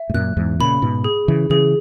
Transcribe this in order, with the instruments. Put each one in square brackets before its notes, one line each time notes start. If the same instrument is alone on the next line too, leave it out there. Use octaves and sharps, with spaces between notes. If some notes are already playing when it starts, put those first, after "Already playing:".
Already playing: [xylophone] E5
[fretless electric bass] G#2
[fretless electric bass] F#2 A#2 [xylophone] F#6
[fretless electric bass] E2 G#2
[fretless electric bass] A#2 C#3 [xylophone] B5
[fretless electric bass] G#2 B2
[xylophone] G#4
[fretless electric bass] C#3 E3
[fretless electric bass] C#3 E3 [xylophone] G#4